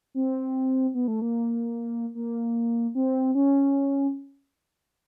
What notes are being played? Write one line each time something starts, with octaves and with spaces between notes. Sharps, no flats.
C4
B3
A3
A#3
A#3
C4
C#4